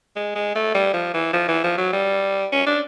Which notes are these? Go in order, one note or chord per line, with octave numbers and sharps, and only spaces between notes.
G#3
G#3
A3
G3
F3
E3
F3
E3
F3
F#3
G3
C#4
D4